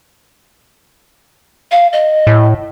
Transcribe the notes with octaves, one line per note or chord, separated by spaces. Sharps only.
F5
D#5
A2